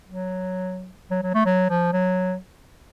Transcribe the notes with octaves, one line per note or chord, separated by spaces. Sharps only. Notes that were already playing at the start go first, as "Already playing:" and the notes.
F#3
F#3
F#3
A3
F#3
F3
F#3